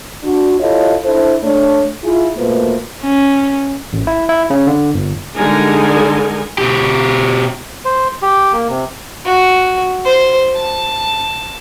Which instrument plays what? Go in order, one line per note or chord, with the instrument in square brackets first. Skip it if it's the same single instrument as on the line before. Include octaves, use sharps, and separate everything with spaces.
[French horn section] D4 F#4
E4 F4 G4 A4 C#5 D#5
D4 E4 A4 C5
A3 D4 C#5
E4 F4 G#4
B2 A3 A#3 F4 B4 C5
[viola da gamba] C#4
[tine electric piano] A1
E4
E4
C#3
D3
G1
[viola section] D3 G3 G#3 D#4 A#4 G#5
[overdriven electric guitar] B2 G4
[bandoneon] C5
G4
A#3
C3
[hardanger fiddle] F#4
C5
A5